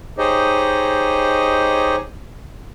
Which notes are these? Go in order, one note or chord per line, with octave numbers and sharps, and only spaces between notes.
D#4 G4 G#4 C5 C#5 D#5